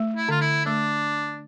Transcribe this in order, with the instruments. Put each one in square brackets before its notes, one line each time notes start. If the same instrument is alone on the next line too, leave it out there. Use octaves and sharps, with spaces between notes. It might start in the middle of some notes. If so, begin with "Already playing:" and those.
Already playing: [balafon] A3
[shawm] E4
[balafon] D3 [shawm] F4
[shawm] E4
[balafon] A3 [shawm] D4